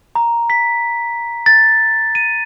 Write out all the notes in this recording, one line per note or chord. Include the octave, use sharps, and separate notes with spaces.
A#5
B6
A6
D#7